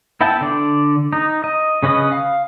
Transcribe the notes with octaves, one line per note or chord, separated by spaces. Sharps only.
B3 E4 E5 G5 A5
D3 D5
D#4
D#5
C#3 C#4 B4 D#5 D#6
F5